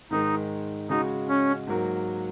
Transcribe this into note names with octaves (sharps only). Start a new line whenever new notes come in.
G#2 D#3 G#3 D#4
C#3 G#3 D#4 F#4
C#4
G#2 F#3 A#3 F#4 A#4